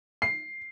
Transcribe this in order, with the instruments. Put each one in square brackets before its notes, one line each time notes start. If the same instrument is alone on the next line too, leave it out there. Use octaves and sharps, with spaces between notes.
[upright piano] C7